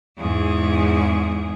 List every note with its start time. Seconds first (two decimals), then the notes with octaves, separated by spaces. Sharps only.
0.18 E2 G#2 G#4